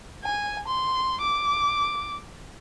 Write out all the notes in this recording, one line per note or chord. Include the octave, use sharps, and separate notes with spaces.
G#5
C6
D6